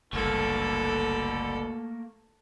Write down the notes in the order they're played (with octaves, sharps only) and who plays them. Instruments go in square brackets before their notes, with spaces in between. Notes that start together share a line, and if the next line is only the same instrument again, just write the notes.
[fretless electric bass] F#1 C2 [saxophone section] B2 D3 [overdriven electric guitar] A3 A#3 [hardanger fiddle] A4